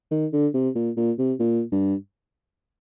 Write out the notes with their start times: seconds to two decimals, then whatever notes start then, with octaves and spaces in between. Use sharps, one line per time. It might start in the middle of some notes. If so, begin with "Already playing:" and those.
0.12 D#3
0.33 D3
0.54 C3
0.76 A#2
0.97 A#2
1.18 C3
1.40 A#2
1.72 G2